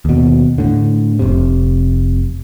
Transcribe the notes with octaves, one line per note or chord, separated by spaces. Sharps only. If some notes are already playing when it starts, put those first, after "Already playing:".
D#2 B2
A2 D3
F1 C3